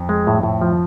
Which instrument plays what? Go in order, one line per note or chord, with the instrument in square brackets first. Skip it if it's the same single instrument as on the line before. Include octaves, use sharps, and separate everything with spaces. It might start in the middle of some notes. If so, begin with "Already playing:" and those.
Already playing: [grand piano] F2
[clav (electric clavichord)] G#3
A2
A2
F3